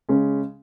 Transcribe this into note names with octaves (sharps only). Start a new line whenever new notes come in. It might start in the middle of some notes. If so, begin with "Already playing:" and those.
C#3 G#3 C#4